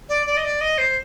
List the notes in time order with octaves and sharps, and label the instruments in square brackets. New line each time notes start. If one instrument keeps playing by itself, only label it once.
[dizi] D5
D5
D#5
D5
D#5
C5